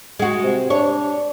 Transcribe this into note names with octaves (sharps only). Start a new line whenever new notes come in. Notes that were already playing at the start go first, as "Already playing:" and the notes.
G#3 F#4
C3
D4 C#5